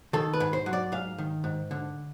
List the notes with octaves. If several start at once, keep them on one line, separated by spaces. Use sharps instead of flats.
D#3 A4
B4
G#2
C5
F#3
D5
G#2 F5
D#3
G#2
D3